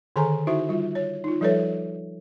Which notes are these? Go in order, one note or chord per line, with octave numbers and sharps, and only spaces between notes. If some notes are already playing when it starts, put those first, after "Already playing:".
D3 D#3 G#4 A4 G#5 A#5
D#4 E4 F#4 C5 E5
G3 F4
C#5
D#4 F4
F3 G3 A4 B4 C#5 E5